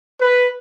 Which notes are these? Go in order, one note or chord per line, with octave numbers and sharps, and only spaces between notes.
B4